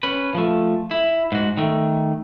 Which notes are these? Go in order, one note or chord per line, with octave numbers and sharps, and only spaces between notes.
C#4 B4
F3 A3
E4
G#2 F#4
D#3 A3